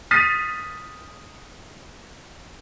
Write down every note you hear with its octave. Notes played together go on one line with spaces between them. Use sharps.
D#6 F6 A6 B6 C7 D#7